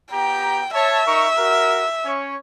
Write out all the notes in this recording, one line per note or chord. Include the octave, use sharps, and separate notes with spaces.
B3 G4 G5 A#5
C#5 E5 A5
D#4 A#4 C#6
F#4 A#4
C#4 C#5